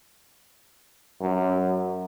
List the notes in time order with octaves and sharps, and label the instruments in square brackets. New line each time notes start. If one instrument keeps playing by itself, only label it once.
[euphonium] F#2